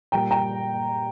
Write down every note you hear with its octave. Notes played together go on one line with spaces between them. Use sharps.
A#2 G3 A#3 G5 A#5
G5 A#5